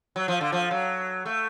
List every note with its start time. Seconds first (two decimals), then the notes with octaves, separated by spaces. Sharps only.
0.16 F#3
0.28 F3
0.41 D3
0.52 F3
0.71 F#3
1.25 A3